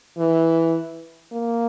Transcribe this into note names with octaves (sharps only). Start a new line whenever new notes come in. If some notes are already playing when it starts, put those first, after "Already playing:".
E3
A#3